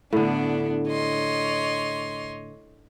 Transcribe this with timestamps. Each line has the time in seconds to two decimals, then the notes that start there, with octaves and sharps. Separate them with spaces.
0.13 A2 D3 B3 D4
0.89 C#5 D#5 C6